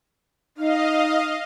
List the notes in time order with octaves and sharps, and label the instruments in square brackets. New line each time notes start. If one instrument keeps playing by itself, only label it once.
[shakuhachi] D#4 [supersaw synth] D#5 F5